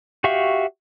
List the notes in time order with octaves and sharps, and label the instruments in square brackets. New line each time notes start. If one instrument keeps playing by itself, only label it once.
[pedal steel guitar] F#4 G4 E5 F5 C#6